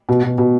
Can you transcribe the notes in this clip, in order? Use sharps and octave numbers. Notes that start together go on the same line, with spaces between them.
B2
B2
B2